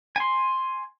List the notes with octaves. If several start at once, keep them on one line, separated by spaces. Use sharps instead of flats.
G#5 C6